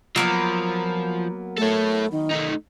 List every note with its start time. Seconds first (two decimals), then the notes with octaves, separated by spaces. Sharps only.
0.16 F3 F#3 A#3 B3
1.58 A3 A4 C#5
2.11 D#3
2.31 A3 D#4